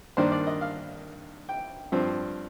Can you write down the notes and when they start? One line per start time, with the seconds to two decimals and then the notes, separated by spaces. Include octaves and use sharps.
0.17 G2 D#3 A#3 D4 C5
0.32 D5
0.47 D#5
0.61 F5
1.49 G5
1.92 G2 F3 C4